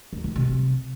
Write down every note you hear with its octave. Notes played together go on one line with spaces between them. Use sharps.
E2
F3
C3